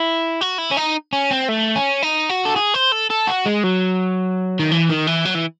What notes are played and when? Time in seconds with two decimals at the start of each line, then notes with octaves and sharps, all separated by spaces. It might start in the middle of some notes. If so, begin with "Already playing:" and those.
Already playing: E4
0.41 F#4
0.59 E4
0.71 C#4
0.77 D#4
1.13 C#4
1.31 C4
1.49 A3
1.76 C#4
2.02 D#4
2.29 F#4
2.45 A4
2.56 G#4
2.74 C5
2.92 A4
3.10 A4
3.28 F#4
3.46 G#3
3.64 F#3
4.59 D#3
4.71 E3
4.89 D#3
5.07 E3
5.25 F#3
5.35 E3